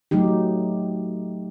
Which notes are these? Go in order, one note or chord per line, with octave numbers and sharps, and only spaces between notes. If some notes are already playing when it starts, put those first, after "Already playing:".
F#3 A3 D#4 G4